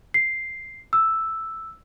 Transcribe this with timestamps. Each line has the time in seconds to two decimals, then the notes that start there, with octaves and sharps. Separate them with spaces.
0.14 C7
0.93 E6